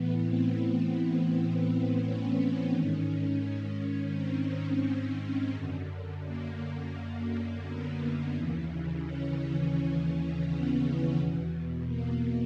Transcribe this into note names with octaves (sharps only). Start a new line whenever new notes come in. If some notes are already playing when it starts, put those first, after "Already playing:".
Already playing: A2 E3 B3
C4
C#4
G#2 D#3 C#4
C4
F#2 D3
A#3
B3
D#2 C#3 E3
C#4
B3
E2 B2
A#3